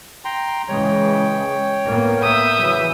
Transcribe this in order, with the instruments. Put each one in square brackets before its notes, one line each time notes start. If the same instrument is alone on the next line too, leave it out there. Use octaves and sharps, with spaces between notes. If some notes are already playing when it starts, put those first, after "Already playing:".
[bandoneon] G5 A#5 C6
[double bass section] C#3 E3 G#3 [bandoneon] C#5 G5
[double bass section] A2 A#3 B3
[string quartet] E5 D#6 G6
[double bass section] C#3 E3 F#3